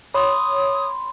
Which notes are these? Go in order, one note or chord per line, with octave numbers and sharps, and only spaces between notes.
C#5 B5 C6 D#6